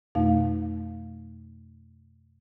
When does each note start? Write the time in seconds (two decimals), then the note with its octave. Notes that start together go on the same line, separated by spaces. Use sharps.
0.15 F2 B2 A3 D#4 F5